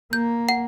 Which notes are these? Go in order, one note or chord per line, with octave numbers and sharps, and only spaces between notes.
A#3 G6
F#5